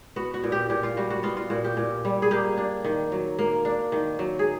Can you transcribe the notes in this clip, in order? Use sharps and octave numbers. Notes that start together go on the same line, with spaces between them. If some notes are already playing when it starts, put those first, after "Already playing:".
B3 F#4
F#4
A#2
G4
A#2 G4
F4
G3 F#4
F#4
B3 F4
F4
A#2 F#4
G4
A#2
G3
G#4
A#3 G4
D4
D#3
F#3
A#3
D4
D#3
F#3
G#4